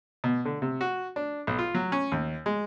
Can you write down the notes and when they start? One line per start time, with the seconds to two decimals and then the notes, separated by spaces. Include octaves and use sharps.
0.24 B2
0.45 D3
0.62 C3
0.81 F#4
1.16 D4
1.47 B1
1.59 F4
1.75 F#3
1.92 C#4
2.12 D#2
2.46 G#3